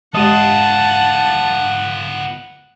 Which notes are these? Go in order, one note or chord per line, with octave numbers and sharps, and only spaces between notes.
G#3 B3 F4 G4 D5 F#5 A5